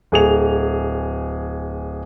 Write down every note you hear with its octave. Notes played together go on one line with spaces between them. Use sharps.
D1 G#4 F7